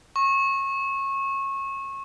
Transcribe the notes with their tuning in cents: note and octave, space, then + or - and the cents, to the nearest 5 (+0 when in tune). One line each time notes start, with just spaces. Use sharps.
C#6 -25